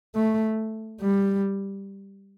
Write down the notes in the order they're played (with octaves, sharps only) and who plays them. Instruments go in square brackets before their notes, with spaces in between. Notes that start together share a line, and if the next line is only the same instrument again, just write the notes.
[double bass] A3
G3